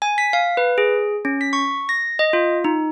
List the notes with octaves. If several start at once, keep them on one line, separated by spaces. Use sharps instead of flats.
G#5
B6
F5
B4
G#4
C#4
B6
C#6
A#6
D#5
F4
D#4